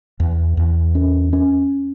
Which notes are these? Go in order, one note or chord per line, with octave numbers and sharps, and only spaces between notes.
E2
E2
C#4
C#4